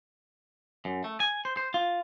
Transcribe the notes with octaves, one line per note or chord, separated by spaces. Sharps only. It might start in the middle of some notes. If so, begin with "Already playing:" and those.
F#2
A3
G#5
C5
C5
F4